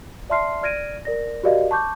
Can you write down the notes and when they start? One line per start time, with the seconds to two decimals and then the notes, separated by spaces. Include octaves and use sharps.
0.30 D5 E5 A5 C6 F6 C7
0.63 D5 F6 G#6 A#6 D7 D#7
1.05 A#4 D5 A#6
1.43 F#4 G4 A#4 D5 D#5 F5
1.71 A5 C#6 D6 G6